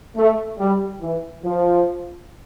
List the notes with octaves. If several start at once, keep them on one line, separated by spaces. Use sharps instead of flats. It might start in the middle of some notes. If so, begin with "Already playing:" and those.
A3
G3
E3
F3